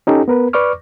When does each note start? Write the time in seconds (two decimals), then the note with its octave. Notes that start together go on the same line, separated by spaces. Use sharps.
0.07 C#4 D#4 G4 A4
0.28 B3 A#4 B4
0.53 B4 D5 C#6 D6 F6